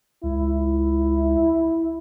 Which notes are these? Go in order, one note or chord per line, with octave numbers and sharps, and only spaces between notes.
C#2 E4